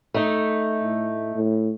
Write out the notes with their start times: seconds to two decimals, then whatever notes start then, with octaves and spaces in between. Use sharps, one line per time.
0.14 A3 D#4
0.83 A2
1.35 A2